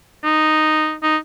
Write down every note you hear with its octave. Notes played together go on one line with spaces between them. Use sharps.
D#4
D#4